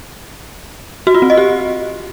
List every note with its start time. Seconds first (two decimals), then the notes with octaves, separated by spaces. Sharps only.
1.07 F#4
1.14 F4
1.22 C4
1.30 D#5
1.37 G4